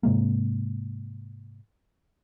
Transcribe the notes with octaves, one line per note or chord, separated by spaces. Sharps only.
G#2 C3 G#3 A#3